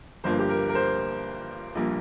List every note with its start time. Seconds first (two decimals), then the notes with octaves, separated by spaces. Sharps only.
0.24 G1 G2 F3 A#3 C5
0.39 G4
0.49 A#4
0.69 A#4
0.75 C5
1.75 A#1 A#2 G3 A#3